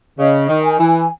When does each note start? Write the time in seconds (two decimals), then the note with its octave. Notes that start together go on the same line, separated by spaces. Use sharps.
0.19 C#3 D#5
0.49 D#3
0.64 G#5
0.79 E3